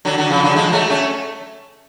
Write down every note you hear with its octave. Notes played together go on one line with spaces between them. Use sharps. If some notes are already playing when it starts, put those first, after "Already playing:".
D3 F#3
D3 F#3
C#3 F3
D3 F#3
F3 G#3
F#3 A3
A3 C#4